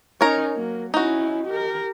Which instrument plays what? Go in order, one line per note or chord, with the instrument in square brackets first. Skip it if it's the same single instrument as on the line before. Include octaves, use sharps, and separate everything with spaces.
[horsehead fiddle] C#4 D#4 [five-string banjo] A#4 C#5
[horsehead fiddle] F#3 A#3
[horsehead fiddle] C#4 E4 [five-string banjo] D#4 F#4
[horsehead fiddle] G4 A#4